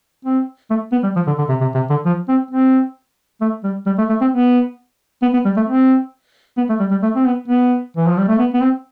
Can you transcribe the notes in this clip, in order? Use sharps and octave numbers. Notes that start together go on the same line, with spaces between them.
C4
A3
B3
G3
F3
D3
D3
C3
C3
C3
D3
F3
C4
C4
A3
G3
G3
A3
A3
C4
B3
B3
B3
G3
A3
C4
B3
A3
G3
G3
A3
C4
B3
B3
E3
F3
G3
A3
B3
B3
C4